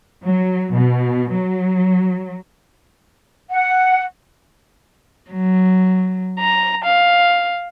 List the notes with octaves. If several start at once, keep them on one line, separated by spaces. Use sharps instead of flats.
F#3
B2
F#3
F#5
F#3
A#5
F5